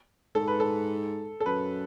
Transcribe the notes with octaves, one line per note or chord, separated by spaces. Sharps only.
G#2 A4
B4
A4
A4
F#2 B4